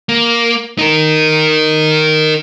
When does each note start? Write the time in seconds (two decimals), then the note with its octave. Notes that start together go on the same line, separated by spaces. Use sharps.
0.09 A#3
0.79 D#4 A#4